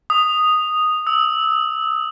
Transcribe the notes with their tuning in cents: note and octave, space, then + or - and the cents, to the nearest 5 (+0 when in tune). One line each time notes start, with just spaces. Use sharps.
D#6 -5
E6 -15